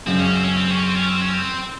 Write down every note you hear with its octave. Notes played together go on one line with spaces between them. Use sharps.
F#2 C#3 G#3 C4
C#4
C4
C#4
C4
C#4
C4
C#4
C4
C#4
C4